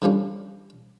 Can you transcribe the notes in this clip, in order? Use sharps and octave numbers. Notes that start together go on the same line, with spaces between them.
D3 F3 G3 C#4